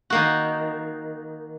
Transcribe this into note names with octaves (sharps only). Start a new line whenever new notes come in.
D#3 A#3 F#4